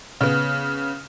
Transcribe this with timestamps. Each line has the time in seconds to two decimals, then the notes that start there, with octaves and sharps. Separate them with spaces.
0.21 C#3 B3